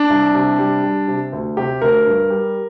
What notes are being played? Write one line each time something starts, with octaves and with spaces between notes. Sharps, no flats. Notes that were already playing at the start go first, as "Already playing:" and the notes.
Already playing: D4
C2
C3
G3
G3
C3
D2
C3 G4
D2 A#4
G2
G3